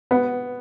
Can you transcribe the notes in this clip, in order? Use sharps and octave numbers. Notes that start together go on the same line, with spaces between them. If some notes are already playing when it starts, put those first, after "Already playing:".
B3